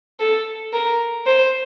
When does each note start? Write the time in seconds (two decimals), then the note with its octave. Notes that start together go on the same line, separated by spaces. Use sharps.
0.20 A4
0.73 A#4
1.27 C5